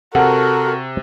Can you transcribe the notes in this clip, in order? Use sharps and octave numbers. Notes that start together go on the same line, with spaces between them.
C3 F#4 A4 A#4 F#5